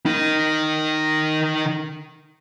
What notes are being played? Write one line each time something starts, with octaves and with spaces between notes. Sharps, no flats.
D#3 D#4